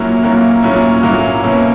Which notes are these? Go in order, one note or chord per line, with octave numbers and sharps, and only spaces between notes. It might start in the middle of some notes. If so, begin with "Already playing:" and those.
Already playing: A#2 F#3 A#3 C#4 E4
A#2 F#3 A#3 C#4 E4
A#2 F#3 A#3 C#4 E4
A#2 F#3 A#3 C#4 E4
B2 A#3 C#4 E4